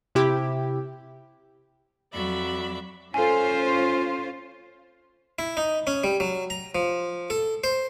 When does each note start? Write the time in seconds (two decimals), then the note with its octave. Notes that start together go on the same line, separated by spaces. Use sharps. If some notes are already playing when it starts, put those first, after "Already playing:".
0.15 C3 E4 G4
2.12 F2 F#3 D5 E5 B5
3.14 C#4 F4 A4 C5 G#5
5.39 E4
5.57 D#4
5.87 C#4
6.04 G3
6.20 F#3
6.50 A#5
6.75 F3
7.30 A4
7.64 C5